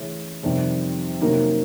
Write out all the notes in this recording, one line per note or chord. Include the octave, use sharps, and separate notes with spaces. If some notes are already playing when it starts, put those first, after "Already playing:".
Already playing: C#3 E3 A3 C#4
F2 C3 D#3 G3 C4
C3 D#3 F#3 A#3 C#4